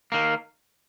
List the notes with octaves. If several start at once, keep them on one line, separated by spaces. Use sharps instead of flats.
D#3 A#3